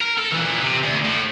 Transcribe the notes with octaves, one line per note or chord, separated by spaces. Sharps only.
A#4
A4
A#2 E3
C3
D2
A2